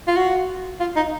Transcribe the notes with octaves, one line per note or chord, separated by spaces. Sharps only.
F4
F#4
F4
D#4